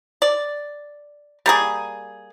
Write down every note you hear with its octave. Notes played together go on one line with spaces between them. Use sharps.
D5
G3 A#3 G#4